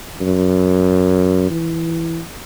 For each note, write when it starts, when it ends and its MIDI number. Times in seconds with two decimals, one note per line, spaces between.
0.21 1.50 42
1.51 2.20 52